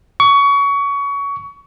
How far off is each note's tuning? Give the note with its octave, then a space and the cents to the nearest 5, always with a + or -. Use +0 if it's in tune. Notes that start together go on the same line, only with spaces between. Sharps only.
C#6 +25